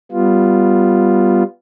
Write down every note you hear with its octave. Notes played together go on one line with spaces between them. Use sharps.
G3 B3 F4